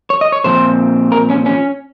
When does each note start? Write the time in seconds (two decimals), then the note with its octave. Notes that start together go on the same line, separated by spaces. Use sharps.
0.10 C#5
0.21 D#5
0.32 C#5
0.44 A#2 F3 C4 C5
1.12 A#4
1.30 C#4
1.46 C#4